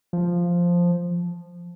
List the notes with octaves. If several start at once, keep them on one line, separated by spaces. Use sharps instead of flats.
F3